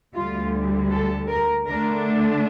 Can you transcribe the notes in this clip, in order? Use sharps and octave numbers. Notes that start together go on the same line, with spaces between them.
D2 D3 G3 F4
A4
A#4
D3 A3 D4 A#4